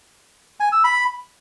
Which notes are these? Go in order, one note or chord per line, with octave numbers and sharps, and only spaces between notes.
G#5
E6
B5